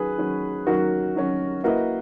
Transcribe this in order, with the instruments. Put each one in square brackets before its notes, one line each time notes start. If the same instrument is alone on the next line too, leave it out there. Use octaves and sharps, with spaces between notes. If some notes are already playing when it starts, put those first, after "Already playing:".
Already playing: [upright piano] D#3 F#3 C#4 [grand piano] G#4 B4
[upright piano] D#3 F#3 C#4
[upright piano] D#3 F#3 C#4 [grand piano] F#4 A#4
[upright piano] D#3 F#3 C#4
[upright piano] A#3 E4 B4 D#5 [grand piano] F#4 A#4